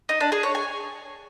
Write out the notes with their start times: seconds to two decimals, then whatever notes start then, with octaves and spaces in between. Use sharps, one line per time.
0.09 D#4
0.20 D4
0.32 G#4
0.43 C#5
0.55 G#5